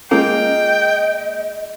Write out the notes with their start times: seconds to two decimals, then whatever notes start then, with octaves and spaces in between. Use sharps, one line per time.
0.11 G#3 A#3 C#4 F4 A4 D#5 G5